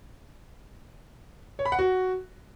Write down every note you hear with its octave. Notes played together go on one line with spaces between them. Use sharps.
C#5
B5
F#5
F#4